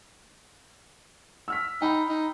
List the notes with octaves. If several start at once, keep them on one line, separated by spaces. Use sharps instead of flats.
E6 F6 B6
D#4 G5 B5
D#4